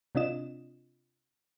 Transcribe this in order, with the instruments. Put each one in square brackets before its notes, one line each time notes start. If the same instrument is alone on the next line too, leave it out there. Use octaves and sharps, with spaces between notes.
[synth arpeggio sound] C3 C4 D4 F4 D#5 E7